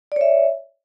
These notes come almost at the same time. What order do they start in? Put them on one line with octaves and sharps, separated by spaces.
D5 C#5 E5